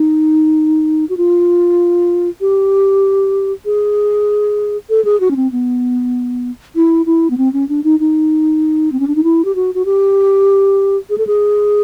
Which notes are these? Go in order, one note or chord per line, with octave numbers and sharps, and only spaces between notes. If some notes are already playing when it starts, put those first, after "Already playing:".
Already playing: D#4
F#4
F4
G4
G#4
A4
G#4
F#4
C#4
C4
B3
E4
E4
B3
C4
C#4
D4
D#4
D#4
C4
C#4
D4
D#4
E4
G4
F#4
F#4
G4
G#4
A4
G#4